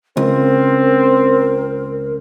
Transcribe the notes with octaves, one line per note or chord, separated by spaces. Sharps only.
C#2 C4 A#4